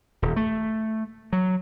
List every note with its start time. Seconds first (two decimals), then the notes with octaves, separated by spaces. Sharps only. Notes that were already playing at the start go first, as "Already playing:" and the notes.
0.22 D#1
0.36 A3
1.33 F#3